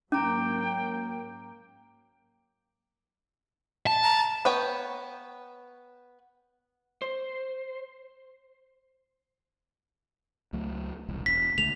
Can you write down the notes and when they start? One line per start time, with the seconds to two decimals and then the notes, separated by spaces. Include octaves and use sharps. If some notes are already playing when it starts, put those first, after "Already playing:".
0.12 G#2 F#3 A#3 C#4 G5 A#5 D6
3.87 A5
4.03 A#5
4.45 B3 B4 C#5 G5
7.02 C5
10.53 C#2 F#3 A3
11.09 E1 C2
11.26 E1 B6
11.58 C#2 D3 A3 F7